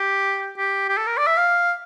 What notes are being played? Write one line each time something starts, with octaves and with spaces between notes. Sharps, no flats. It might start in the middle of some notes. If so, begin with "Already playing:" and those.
Already playing: G4
G4
G4
A4
A#4
D5
E5
F5